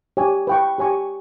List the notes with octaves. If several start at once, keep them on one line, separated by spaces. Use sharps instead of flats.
G4 C#5 G#5
B4 G5 C#6
G4 C#5 G#5 C#6